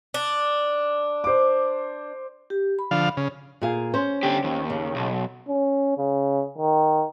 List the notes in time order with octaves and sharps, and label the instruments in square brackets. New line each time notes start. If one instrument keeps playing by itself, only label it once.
[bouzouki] D4
[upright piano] C5 D6
[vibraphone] G4
B5
[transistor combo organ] D3 F3 F5
C#3
[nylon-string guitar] A#2 G#4 F5
C#4 C5
[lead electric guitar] D3 G4
D#2
[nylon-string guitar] C#3
[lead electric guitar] B1
[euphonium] C#4
C#3
D#3